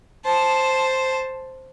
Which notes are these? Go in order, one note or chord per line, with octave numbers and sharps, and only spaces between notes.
C5 A5